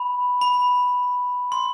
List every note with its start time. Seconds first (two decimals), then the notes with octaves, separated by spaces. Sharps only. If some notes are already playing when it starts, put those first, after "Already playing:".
Already playing: B5
0.41 B5
1.52 C6